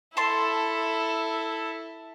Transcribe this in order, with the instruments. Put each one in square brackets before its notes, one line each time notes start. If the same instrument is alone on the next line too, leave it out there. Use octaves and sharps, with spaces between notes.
[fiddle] E4 A4 [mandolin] A5 C6